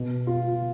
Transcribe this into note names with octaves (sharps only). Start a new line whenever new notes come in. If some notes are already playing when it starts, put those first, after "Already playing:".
Already playing: B2
F4